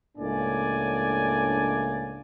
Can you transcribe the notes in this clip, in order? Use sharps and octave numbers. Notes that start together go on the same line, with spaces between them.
C#2 A2 A#3 D4 D5 G#5